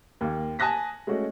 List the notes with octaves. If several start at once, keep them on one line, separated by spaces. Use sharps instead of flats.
D#2 A#3
G#5 A5 D#6 F#6 A#6 B6
G#3 A3 C#4 F#4